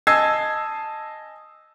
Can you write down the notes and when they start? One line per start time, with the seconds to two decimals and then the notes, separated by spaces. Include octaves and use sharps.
0.07 D#5 G#5 A5 E6 G#6 C7